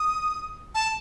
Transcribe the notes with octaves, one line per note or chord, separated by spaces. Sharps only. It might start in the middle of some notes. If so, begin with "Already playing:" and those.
Already playing: D#6
A5